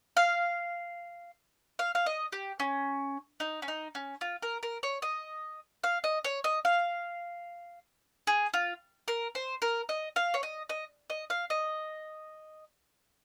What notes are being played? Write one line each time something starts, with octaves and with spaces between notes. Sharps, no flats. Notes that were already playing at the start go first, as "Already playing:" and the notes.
F5
F5
F5
D#5
G4
C#4
D#4
C#4
D#4
C#4
F4
A#4
A#4
C#5
D#5
F5
D#5
C#5
D#5
F5
G#4
F4
A#4
C5
A#4
D#5
F5
C#5
D#5
D#5
D#5
F5
D#5